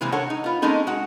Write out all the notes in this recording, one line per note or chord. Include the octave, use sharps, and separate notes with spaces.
C3 E3 G#3 A#3 C4
D4 A4 A#4 C#5 F#5
D#4
B3 F4
G#3 A#3 C4 C#4 D#4 A4
G#3 F#4 F#5